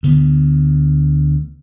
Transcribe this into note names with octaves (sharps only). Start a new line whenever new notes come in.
D2 D3 B3